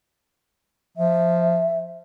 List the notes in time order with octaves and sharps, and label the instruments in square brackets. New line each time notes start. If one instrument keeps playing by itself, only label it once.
[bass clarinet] F3 [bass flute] E5